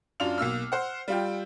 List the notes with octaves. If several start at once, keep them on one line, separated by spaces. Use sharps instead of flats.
F#2 D4 F4 F6 F7
B1 A#3 E6 F6
C5 F#5
G3 F4 G5